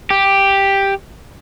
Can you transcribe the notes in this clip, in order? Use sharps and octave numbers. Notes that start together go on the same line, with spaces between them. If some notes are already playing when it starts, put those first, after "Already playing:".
G4